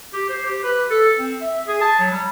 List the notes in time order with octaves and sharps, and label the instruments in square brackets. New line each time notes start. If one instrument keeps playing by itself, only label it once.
[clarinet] G4
C5
G4
B4
A4
C4
E5
G#4
A5
F#3
G3